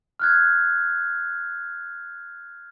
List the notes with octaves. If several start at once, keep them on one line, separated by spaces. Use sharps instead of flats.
F6 F#6 G#6